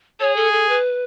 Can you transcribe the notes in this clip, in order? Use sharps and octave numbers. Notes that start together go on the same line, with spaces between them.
G#4 C#5
A4
A4
B4